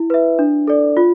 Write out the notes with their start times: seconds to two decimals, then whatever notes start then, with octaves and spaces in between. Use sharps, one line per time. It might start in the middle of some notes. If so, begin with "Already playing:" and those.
Already playing: E4
0.10 B4 E5
0.39 D4
0.67 A4 D5
0.97 F4